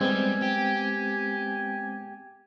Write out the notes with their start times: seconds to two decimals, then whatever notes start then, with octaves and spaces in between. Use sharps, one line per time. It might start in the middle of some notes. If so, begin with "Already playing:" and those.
0.01 G3 G#3 B3 C4 G#5
0.42 G4